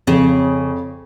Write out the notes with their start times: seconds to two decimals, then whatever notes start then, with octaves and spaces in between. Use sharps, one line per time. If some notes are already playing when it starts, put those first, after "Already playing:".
0.07 F2 C#3